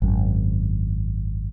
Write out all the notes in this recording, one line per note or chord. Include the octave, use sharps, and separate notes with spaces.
G#1 F#2